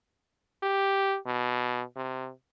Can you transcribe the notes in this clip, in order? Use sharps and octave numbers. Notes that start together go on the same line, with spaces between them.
G4
B2
C3